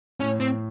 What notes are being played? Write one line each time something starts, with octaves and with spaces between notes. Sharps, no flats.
A2 C#4
C4